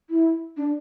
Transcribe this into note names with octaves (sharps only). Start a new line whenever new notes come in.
E4
D4